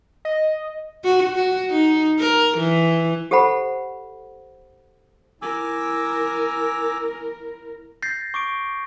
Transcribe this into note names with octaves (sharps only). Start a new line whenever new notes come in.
D#5
F#4
F#4
D#4
A#4
E3
G4 A4 C5 F#5 B5
E4 A#4 G#5 D6 E6
G6 A6 A#6 C7
C#6 D6 D7